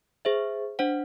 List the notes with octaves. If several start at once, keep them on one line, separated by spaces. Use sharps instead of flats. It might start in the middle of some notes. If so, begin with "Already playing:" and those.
G#4 C5 E5
D4 C5 F#5